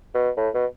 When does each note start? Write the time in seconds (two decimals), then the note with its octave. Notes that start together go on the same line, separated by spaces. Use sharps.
0.14 B2
0.37 A2
0.54 B2